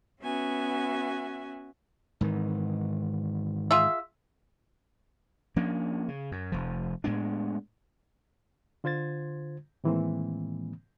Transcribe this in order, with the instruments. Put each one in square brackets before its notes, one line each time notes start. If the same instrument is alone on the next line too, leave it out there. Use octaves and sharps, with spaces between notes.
[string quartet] B3 C#4 F#4 E5 G#5
[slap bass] G#2 D#3 E3
[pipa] F4 G#4 E5
[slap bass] F3 A#3 C#4 D4
C#3
F#2
F1 F3
A2 G#3 B3 D4
[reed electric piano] D3 F4 C5 G#6 A6
A2 D#3 E3 G#3 A#3 C4